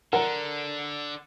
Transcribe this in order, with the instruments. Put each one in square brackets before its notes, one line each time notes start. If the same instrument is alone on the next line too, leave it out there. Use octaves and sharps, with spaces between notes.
[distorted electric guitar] D3 [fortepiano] A#4 F#5